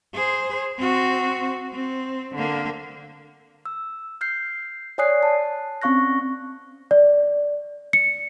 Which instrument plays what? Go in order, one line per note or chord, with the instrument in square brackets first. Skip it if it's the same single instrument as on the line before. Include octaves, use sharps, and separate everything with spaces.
[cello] G#4 C5
C4 F#4
C4
D3 A#3
[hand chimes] E6
F6 G6 C7
C#5 D5 G#5 D#6 F#6 C7
A5
C4 C#4 F5 C#6 F#6 A#6
[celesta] D5
C#7